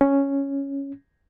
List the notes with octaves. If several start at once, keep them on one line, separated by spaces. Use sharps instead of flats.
C#4